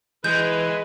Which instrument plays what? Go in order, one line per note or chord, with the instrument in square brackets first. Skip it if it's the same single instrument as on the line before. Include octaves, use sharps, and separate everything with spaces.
[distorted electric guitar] E3 [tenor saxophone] G#3 [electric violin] B4 [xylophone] G6